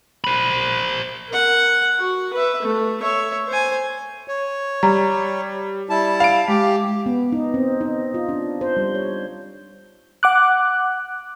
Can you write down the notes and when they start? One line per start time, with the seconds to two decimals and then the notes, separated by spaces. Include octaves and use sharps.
0.24 C5 B5
1.29 A#4 F#5
1.99 F#4
2.33 B4 E5
2.62 A3
3.00 C#5 E5
3.48 C5 G#5
4.28 C#5
4.83 G3 A#5
5.89 G3 E4 A5
6.20 F5 D7
6.48 G#3 G4
7.06 B3
7.33 D#4
7.54 C4
7.81 D#4
8.14 F4
8.29 D4
8.61 C5
8.77 G3
8.95 C#5
10.23 F#5 D6 F#6